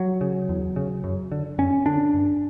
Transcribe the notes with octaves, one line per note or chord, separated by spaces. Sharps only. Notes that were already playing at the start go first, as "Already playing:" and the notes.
Already playing: F#3
C#3
E2
C#3
F#2
D3
F#2 C#4
D3 D4
G2